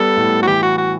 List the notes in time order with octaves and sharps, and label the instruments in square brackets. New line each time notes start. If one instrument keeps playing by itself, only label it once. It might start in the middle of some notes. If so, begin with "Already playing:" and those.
Already playing: [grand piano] G3 B3 [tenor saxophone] A4
[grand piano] A2
[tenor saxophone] F#4
[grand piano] E3 [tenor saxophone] G4
[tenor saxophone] F#4
F#4